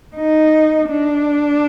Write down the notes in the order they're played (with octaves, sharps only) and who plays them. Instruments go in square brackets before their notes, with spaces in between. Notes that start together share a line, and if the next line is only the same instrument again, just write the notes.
[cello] D#4
D4